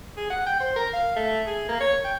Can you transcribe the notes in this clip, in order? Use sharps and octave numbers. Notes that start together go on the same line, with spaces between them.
G#4
F#5
G5
C5
A#4
F5
A3
G#4
A#3
C#5
G5